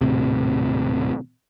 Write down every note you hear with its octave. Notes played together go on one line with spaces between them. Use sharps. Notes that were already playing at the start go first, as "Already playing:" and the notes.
D#1 G#1 A2 C3